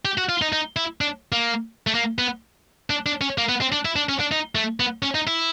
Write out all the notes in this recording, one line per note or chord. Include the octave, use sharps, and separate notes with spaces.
G4
F#4
F4
D#4
D#4
E4
D4
A#3
A3
A#3
B3
D4
D4
C#4
A#3
B3
C4
D4
E4
D4
C#4
D4
D#4
A3
B3
C#4
D#4
E4